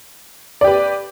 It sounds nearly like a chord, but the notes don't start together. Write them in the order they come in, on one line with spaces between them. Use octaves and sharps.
D5 G4 B4